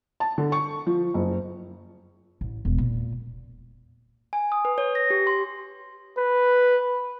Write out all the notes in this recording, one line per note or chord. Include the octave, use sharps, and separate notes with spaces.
A5
D3
C#6
F3
F#1
A1
E1
A#2
G#5
D#6
B4
C#5
A#6
G4
C6
B4